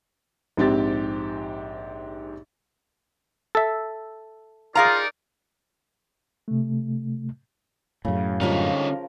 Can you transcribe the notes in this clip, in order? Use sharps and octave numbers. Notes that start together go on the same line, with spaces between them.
A#1 G#2 C4 G4 A6
A4 E5
D#4 F4 G#4 A#4 D5 F5 A#5
C3 A3
F#2 A2 C#3
D3 F3 G3 C#4 D#4 F4 A#4